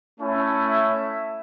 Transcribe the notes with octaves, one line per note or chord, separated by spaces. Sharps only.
A3 C#4 E4
E5